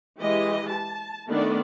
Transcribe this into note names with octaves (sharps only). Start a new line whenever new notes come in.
E3 G#3 G4 D#5
A5
D#3 A3 B3 D4 D5